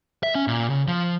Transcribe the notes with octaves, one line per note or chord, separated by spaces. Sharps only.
E5
C#4
A#2
C#3
F3